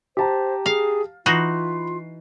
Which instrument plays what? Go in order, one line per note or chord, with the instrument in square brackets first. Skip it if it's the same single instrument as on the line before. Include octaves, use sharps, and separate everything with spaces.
[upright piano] G4 A5 A#5 [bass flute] C5
[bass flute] G#4 [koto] F5
[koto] E3 D#4 F#4 [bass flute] F4 [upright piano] B5 C7